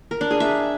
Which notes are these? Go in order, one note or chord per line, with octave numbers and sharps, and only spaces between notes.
A#4
D4
G#4
E5